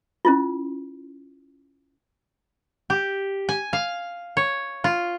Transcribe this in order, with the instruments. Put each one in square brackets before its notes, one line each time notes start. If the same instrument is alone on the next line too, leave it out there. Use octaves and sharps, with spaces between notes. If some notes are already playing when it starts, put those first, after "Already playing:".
[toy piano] C#4 E4 F4
[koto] G4
G#5
F5
C#5
F4